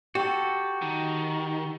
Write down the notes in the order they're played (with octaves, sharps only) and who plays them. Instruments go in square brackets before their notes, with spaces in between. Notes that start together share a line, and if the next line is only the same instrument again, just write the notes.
[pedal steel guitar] F#4 A4 [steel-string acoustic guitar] G4
[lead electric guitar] D#3